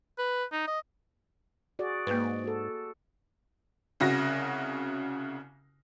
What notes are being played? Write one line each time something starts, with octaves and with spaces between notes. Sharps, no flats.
B4
D#4
D#5
F#4 G#4 D5
G#2 A#3 B4
F#4 A4
C2 C#3 F#4 A#6